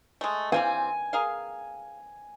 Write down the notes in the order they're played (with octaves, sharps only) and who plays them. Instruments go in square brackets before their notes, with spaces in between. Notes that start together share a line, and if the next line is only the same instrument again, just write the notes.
[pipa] G#3 A3
[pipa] E3 G3 C4 [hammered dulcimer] G#5
[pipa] G#4 A#4 F5